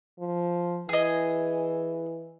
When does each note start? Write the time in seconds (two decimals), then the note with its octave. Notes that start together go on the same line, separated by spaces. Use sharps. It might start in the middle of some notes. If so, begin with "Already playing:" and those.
0.19 F3
0.89 E3 G#4 D#5